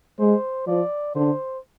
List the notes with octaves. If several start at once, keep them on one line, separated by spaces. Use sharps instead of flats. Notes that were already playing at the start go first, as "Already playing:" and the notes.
G#3 C5
F3 D5
D3 C5